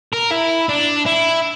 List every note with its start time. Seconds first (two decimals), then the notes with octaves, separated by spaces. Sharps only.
0.13 A#4
0.31 E4
0.69 D4
1.06 E4